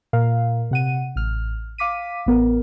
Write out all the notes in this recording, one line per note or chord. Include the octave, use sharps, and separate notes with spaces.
A#2 A#4 F5
C3 F#5 D#7
A1 F6
F5 D6 B6 D#7
A1 B3 A#4